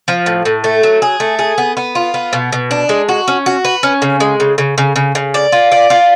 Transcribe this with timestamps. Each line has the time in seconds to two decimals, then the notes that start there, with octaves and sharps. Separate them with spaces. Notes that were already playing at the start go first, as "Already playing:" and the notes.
0.08 F3
0.26 A2
0.45 A2
0.64 A3
0.83 F#3
1.02 G#4
1.20 A3
1.39 G#4
1.58 B3
1.77 B3
1.95 F4
2.14 B3
2.33 B2
2.52 B2
2.71 D4
2.89 G#3
3.09 F#4
3.28 C#4
3.46 F#4
3.64 B4
3.83 C#4
4.02 C#3
4.20 G#3
4.40 C#3
4.58 C#3
4.78 C#3
4.96 C#3
5.15 C#3
5.34 D5
5.52 F4
5.72 D5
5.90 F4